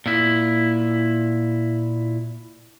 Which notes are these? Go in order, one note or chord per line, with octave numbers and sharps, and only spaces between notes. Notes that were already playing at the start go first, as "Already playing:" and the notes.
A#2 E4